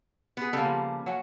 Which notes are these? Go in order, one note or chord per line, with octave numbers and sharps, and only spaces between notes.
B3 G#4
C#3 G3 A#3 A4
F3
F#3 C#4 F#5